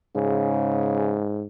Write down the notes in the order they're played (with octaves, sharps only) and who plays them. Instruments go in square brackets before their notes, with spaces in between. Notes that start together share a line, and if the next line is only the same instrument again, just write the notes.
[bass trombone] G#2 [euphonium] C#3